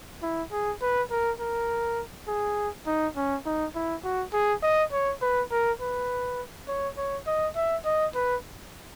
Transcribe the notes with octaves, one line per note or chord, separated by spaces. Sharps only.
E4
G#4
B4
A#4
A#4
G#4
D#4
C#4
D#4
E4
F#4
G#4
D#5
C#5
B4
A#4
B4
C#5
C#5
D#5
E5
D#5
B4